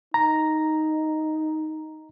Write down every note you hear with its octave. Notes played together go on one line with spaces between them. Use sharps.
D#4 A#5